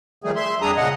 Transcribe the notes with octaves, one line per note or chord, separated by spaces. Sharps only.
D#3 F3 G3 A3 G#4
E5 C6
F2 G3 D4 G#4 A#5 D#6
A#2 C#3 D#5 F#5